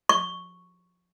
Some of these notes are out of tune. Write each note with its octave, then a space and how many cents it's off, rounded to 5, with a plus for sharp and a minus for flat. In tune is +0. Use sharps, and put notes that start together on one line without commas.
C#6 +0